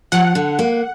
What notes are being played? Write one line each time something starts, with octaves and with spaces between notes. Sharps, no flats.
F3 F#5
D3
A#3